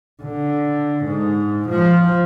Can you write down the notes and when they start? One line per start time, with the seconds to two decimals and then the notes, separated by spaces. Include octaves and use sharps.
0.22 D3
1.05 G#2
1.68 F3